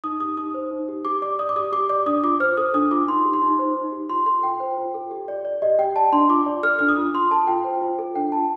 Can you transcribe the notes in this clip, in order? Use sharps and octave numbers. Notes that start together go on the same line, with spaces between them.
D#4 D#6
G4 D#6
D#4 D#6
C5
D#4
G4
G4 D6
D5 D6
D5 D#6
D6
G4 D#6
G4 D6
D5 D6
D4 D#6
F4 D6
C5 F6
A4 D#6
D4 D#6
F4 D6
D#4 C6
G4
C6
D#4
C5
D#4
G4
F4 C6
A4 C6
F4 G5
C5
F4
A4
G4
D5
D5
G4 D#5
G4 G5
D5 A5
D4 C6
F4 D6
D5
A4 F6
D4 F6
D#6
F4
F4 C6
A4 A5
F4 G5
C5
F4
A4
D4 G5
F4 A5